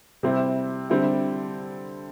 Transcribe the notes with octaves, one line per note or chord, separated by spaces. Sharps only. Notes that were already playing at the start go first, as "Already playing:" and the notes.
C3 G3 C4 E4
D3 G3 C4 E4